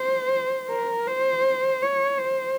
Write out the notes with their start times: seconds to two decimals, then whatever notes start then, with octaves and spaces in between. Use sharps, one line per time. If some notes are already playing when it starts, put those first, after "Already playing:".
Already playing: C5
0.71 A#4
1.07 C5
1.82 C#5
2.19 C5